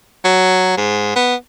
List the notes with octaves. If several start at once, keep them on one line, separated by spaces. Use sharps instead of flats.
F#3
G#2
B3